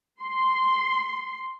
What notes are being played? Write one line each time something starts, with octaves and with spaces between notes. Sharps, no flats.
C6